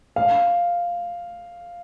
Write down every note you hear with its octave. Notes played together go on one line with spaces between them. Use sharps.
F5